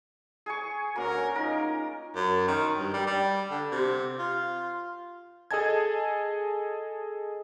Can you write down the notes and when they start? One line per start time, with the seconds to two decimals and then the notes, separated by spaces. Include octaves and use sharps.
0.46 G#4 G#5 C#6
0.96 D2 A#3 C#4 F#4 A#4
1.36 D#4 F4 A#4
2.16 F#2
2.48 D#3
2.78 G2
2.94 G3
3.07 G3
3.51 D3
3.72 C3
4.19 F4
5.51 G#4 A4 D#5 G#5 A5 G#6